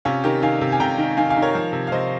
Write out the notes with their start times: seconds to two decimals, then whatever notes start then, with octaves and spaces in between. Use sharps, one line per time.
0.05 C3 C#4 F4
0.24 D#3 G4 A#4
0.42 D#3 F5 G#5
0.61 C3
0.72 G#5
0.80 C3 G5 A#5
0.98 D#3
1.17 D#3 F5 G#5
1.30 F5 G#5
1.37 D#3
1.42 A#4 C#5
1.55 F3
1.73 C3
1.87 F5
1.92 C3 C5 D#5